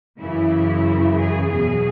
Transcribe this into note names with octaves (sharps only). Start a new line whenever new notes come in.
F#2 C#3 E3 E4
G#4
E2 B2 F#3 G#4